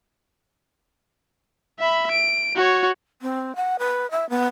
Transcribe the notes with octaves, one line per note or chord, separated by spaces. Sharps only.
E5 B5
D7
F#4 C#5
C4
F#5
B4
E5
B3